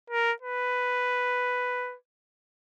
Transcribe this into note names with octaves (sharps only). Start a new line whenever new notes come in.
A#4
B4